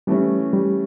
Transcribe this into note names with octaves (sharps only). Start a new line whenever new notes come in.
E3 G3 A3 C#4
G3